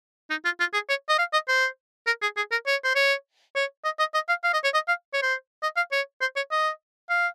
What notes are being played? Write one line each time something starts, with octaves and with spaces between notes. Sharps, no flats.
D#4
F4
F4
G#4
C#5
D#5
F5
D#5
C5
A#4
G#4
G#4
A#4
C#5
C5
C#5
C#5
D#5
D#5
D#5
F5
F5
D#5
C#5
D#5
F5
C#5
C5
D#5
F5
C#5
C5
C#5
D#5
F5